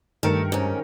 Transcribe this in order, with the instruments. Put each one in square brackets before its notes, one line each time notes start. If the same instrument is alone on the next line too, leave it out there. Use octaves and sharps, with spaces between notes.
[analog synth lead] G2 [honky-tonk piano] D#3 A#4 C#7 [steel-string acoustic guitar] A3
[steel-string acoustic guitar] G#2 C#4